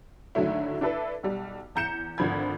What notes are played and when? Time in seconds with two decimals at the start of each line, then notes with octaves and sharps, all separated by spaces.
0.35 G#2 D3 D#3 F#3 A3 E4
0.81 D4 E4 A4 B4
1.23 B1 G3
1.75 E2 A#5 G6 C#7 E7
2.18 G#1 D3 F3 B5 G#6